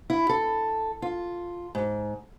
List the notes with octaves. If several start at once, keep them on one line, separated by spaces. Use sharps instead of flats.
E4
A4
F4
G#2